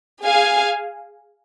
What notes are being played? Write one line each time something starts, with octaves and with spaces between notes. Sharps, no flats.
G#4 F5 G#5